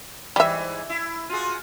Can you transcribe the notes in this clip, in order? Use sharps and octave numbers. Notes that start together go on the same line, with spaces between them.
G#2 E3 G3 E5
E4
F4 F#4 G#4